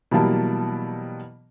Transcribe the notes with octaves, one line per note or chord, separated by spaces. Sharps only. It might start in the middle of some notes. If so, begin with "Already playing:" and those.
B2 E3 F#3 G3 A#3 A5